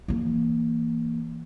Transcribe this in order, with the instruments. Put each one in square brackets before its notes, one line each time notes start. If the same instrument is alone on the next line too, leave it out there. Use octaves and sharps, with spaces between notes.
[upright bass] E3 A#3